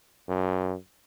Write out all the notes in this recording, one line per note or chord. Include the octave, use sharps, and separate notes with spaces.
F#2